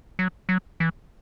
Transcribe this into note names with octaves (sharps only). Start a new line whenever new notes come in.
F#3
F#3
E3